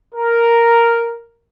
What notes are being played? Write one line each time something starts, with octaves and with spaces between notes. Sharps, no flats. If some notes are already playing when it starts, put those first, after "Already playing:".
A#4